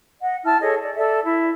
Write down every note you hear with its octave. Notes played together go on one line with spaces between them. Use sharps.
D#5 F#5
E4 A5 F6
G#4 A4 C#5 D#5
D5
A4 D5 E5
E4